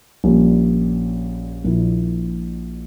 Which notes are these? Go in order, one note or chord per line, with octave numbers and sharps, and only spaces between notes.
A#1 A#2 G3 A#3 C#4
A#1 A#2 A#3 E4